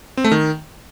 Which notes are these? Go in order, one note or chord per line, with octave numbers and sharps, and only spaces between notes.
C4
A3
D#3